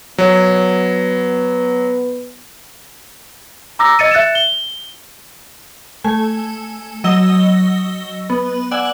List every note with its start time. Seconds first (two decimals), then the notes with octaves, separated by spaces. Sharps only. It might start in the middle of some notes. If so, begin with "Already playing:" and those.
0.18 F#3 B3
3.79 A#5 D6 E6 A#6
3.99 D#5 E6 A6 C#7 D#7
4.11 E5 F#6 A6 C#7 E7
4.35 G7
6.04 A3 G#5
7.04 F#3 D#5 E6 A#6 G7
8.30 B3
8.71 D5 F#5 G#5 E6